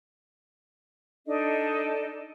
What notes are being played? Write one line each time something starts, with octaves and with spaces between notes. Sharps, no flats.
D4 D#4 A4 D#5